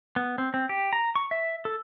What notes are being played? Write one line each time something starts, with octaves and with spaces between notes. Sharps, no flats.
B3
C4
C4
G4
A#5
C#6
E5
A4